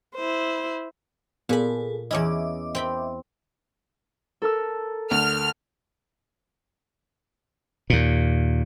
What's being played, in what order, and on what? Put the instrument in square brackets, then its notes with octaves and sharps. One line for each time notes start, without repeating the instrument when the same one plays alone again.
[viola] E4 C5
[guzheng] A#2 B5 [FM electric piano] B3 G#4 A4
[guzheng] E2 C#4 E4 [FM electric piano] D#5 E5 D6
[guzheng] C4 G5 B5
[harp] A4 A#4 E6
[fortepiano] D2 [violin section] F6
[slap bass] D#2 A#2